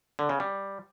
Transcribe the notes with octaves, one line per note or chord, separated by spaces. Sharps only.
D3
C#3
G3